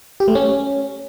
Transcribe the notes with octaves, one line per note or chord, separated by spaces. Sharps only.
G4
A3
C#4